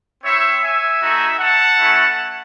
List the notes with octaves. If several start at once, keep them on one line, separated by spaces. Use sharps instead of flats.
C4 E4 C#5 E5
E5 G#5
A3 D#4 F#4
F#5 A5
A3 C#4 E4